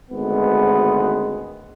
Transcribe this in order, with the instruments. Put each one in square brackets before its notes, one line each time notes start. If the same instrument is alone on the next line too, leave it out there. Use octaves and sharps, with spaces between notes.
[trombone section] G#1 D2 G#3 B3